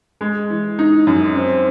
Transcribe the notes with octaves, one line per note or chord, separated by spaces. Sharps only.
G#3
E3
D#4
F#2
C4